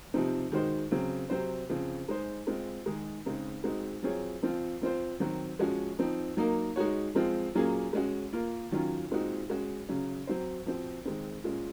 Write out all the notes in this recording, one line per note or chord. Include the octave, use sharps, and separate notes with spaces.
C3 F3 C4 D#4
D#3 G#3 D#4 F#4 C5
C#3 F#3 C4
C3 F#3 C4 F#4 C5
C#3 F3 C4
G#3 D#4 G#4 C5
G#3 C4 F4
D#3 G#3 D#4 G#4
C#3 G#3 C4 D#4
G#3 C4 D#4 F#4
F#3 C4 F4 G#4 C#5
F3 C4 F4
F3 C4 F4 C5
D#3 F#3 C4 F#4
F3 G#3 C#4 F#4
F3 C4 D#4
F#3 A#3 D#4 A#4
G#3 D#4 F#4 C#5
F3 G#3 C4 F4
A#2 F#3 A#3 C#4 G#4
G#3 C#4 F#4
A#3 F4 A#4
D#3 F#3 C#4 F4
A#2 G#3 C4 D#4 F#4
G#3 C#4 F#4
C#3 F#3 C#4
F#3 C4 F#4 C5
F3 C4 F#4
D#3 G#3 C4
A#2 G#3 C#4